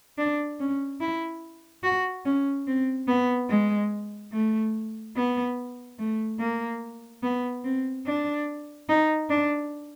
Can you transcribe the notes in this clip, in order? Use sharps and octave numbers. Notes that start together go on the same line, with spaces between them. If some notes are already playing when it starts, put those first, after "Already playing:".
D4
C#4
E4
F#4
C#4
C4
B3
G#3
A3
B3
A3
A#3
B3
C4
D4
D#4
D4